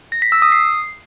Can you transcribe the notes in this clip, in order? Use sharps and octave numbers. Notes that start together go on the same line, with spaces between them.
A#6
B6
E6
D#6
C7